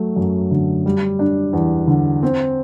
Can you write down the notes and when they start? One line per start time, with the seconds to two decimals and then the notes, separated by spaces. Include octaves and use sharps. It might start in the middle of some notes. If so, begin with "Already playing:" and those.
Already playing: F#3 A3
0.16 F#2
0.51 D3
0.86 G3
1.19 D4
1.53 E2
1.87 D3
2.23 C4